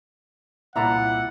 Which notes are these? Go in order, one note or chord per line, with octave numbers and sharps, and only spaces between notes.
C2 A#2 E4 D5 F#5 A5 A#5